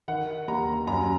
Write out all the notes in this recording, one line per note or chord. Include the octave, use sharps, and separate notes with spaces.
D#3 F#5
D#2 A#5
F#2 A#5